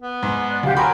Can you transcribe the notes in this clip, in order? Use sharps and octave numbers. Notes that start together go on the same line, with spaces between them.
B3
G#2
D5 F#6
D2 G4 F5 F#5
F#3 A#4 G5 G#5 B5 C6 D6